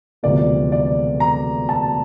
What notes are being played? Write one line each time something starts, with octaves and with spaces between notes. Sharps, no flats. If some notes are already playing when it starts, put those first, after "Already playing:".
E1 D2 C3 F3 A#3 D5
D5
A#5
A5